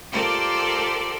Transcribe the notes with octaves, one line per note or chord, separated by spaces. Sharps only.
F4 G4 A4 A#4 C5 D5